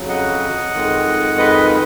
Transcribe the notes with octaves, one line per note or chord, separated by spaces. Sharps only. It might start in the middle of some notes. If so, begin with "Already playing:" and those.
Already playing: F2 C#3 F#3
D#5 F#5
F2 D#3 G#3
B4 D#5